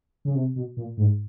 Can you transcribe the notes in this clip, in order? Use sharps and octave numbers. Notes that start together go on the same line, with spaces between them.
C#3
C3
B2
A#2
G#2